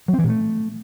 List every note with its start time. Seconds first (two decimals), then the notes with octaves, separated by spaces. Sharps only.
0.08 F#3
0.13 C4
0.19 E3
0.24 A#2
0.29 A3